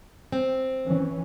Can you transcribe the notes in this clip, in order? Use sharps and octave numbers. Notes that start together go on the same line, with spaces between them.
C4
E3 C#4